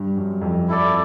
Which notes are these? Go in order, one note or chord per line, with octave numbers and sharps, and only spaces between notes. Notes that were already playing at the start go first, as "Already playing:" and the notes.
Already playing: G2
F#2
F2
E4 A4 D5